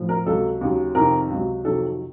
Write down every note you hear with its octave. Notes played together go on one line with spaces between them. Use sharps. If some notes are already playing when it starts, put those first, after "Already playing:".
Already playing: A2 F3
A#4
C#2 C3 F#3 A4
D#2 C#3 F#3
F2 C3 D#3 A#4
C#2 C3 F#3
F2 C3 D#3 F#3 A4